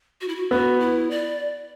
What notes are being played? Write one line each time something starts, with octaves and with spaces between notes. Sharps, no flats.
F#4
E4
F#4
B3 F#4
E4
D5